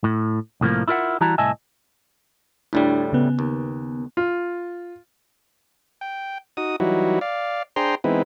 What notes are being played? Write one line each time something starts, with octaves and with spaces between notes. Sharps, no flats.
A2
C2 A2 F3 A#3
E4 F4 A#4 E5 F#5
E3 G3 E4 F#4 A5 A#5
C2 A2 D#5 E5 G#5 A5
D2 A2 G3 D4 E4
C#3 B3
D#2
F4
G5
D#4 F#4 D#6
E3 F#3 G3 D#4 E4 F#4
D5 F5
D4 G#4 C5 G5 A#5 C6
E3 G#3 B3 C4 D#4 E4